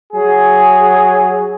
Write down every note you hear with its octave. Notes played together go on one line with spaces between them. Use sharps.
F#3 G#4